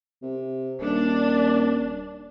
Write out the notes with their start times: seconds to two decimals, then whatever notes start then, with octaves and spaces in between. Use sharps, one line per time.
0.22 C3
0.81 D#1 D4